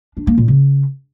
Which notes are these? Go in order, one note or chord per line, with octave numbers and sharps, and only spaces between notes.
D4
A#3
A#2
C#3